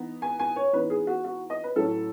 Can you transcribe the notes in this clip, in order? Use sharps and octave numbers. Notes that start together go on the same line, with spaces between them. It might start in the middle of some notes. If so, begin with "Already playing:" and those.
Already playing: E3 B3 D#4
G#5
G#5
C#5
E3 B3 D#4 B4
G#4
F#4
F#4
D#5
B4
A2 F#3 C#4 E4 A4